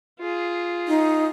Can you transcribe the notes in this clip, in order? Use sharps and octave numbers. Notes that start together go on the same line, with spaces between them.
F4 G#4
D#4